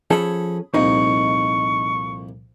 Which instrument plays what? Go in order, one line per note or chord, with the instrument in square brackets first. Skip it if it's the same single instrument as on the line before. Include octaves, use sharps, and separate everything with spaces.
[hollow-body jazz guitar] F3 C#4 A4 [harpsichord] G#4 B5
[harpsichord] C2 F2 A#2 [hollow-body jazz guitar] D#4 [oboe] C#6